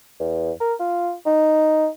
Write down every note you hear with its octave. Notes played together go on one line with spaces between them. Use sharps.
E2
A#4
F4
D#4